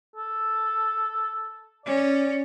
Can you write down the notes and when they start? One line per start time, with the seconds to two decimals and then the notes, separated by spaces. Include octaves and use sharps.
0.16 A4
1.86 C#4 D5